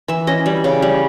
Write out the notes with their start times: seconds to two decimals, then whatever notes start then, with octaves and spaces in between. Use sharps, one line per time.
0.08 E3 E5
0.27 C#4 D#5
0.46 G3
0.64 C#3
0.82 G3